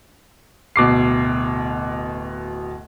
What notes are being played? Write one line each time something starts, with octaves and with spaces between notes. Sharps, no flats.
D1 B2 D6 C7